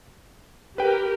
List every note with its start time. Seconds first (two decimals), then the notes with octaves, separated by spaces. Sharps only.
0.78 G4 A#4 B4 G5